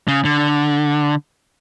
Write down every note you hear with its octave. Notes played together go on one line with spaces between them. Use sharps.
C#3
D3